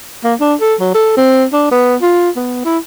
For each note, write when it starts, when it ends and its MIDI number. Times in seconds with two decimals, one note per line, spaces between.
0.24 0.35 58
0.40 0.55 62
0.61 0.75 69
0.80 0.90 54
0.94 1.16 69
1.17 1.45 60
1.53 1.68 62
1.71 1.96 59
2.02 2.30 65
2.37 2.64 59
2.65 2.78 64